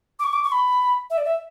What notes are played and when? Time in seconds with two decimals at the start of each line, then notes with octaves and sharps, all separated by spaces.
0.19 D6
0.24 C#6
0.33 D6
0.43 C#6
0.52 B5
1.10 E5
1.17 D5
1.25 E5